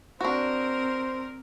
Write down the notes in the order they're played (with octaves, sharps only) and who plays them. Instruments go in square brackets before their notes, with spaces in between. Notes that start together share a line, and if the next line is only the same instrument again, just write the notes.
[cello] C4 A#4 [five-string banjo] D4 F#4 [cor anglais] C5